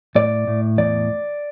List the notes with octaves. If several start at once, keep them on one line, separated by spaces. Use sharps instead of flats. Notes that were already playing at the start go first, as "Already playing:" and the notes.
A2 D5
A2
E2 D5